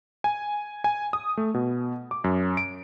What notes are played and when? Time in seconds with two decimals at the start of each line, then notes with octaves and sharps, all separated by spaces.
0.24 G#5
0.84 G#5
1.13 D#6
1.37 A3
1.54 B2
2.11 D6
2.24 F#2
2.57 D7